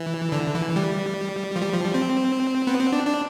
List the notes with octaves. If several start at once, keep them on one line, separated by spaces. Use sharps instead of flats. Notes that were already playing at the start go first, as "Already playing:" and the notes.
Already playing: E3
D3
E3
G3
F3
G3
F3
G3
C4
B3
C4
D4
D4